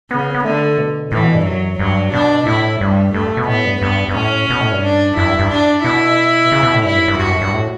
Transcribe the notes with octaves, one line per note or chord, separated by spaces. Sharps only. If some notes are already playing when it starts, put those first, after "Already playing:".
C#3 B3
B3
D3 A3
B2
A2 E3
B2
G2
F#2 F#3
G2 F#3
B2 D4
A2 E4
G2 G3
G2 A3
B2
A2 B3
G2
G2 B3
G2
A2 C#4
B2
A2
G2
D4
F#2 E4
G2
G2
D4
B2 E4
C#3
B2
A2
G2 E4
F#2
G2
G2 F#4
F#2
G2
A2